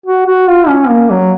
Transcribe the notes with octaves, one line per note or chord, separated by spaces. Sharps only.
F#4
F#4
F4
C#4
A#3
F#3